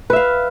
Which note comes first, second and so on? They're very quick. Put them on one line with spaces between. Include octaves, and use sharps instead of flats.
B4 E5 F5